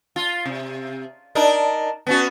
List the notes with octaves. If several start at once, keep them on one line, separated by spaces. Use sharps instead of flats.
F4
C3
D4 D#4 A#4
B3 C#4 F#4